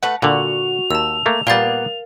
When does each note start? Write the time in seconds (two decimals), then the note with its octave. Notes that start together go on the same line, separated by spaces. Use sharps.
0.03 A3 B4 F#5
0.22 A#2 D3 F#4 F7
0.91 D#2 A5 E6
1.26 A3 A#3
1.47 A#2 G3 A#3 B3 A#4 F5 A6